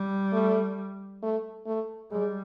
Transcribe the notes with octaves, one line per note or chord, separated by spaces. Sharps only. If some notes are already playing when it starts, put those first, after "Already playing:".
Already playing: G3
A3
A3
A3
G3 G#3